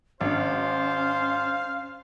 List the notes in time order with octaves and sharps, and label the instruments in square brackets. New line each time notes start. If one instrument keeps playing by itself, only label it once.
[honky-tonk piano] G#1 D4 [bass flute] C#4 [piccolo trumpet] C5 [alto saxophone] F5